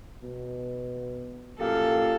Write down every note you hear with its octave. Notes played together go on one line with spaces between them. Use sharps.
B2
F#2 A#2 G4 A4 F5